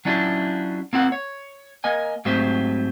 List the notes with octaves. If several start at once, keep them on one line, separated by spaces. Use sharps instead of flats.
F#3 C#4 D4 E4 F4 G4
A#3 C4 F4 F#5
C#5
A#3 A#4 D#5 G#5
G#2 F#3 A3 C4 G4 C5